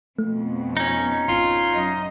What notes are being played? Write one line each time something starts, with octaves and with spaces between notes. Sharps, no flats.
F2 B2 A3
C#4 D#4
G#1 F4
F#2 D#5